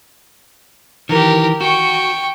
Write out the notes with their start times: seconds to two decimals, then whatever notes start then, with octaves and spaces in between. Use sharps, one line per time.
1.09 D#3 E3 G4 A#4
1.61 F#4 G5 C#6